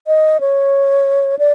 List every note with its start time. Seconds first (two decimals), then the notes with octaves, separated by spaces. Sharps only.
0.07 D#5
0.41 C#5
1.39 D5